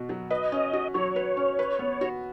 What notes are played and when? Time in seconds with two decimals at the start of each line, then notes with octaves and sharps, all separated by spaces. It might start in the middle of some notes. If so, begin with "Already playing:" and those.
Already playing: B2 F#4
0.09 F#3
0.30 B4 D#5
0.52 C#4
0.73 F#4
0.94 F#3 C#5
1.16 B4
1.37 C#4
1.59 B4
1.79 B3
2.01 F#4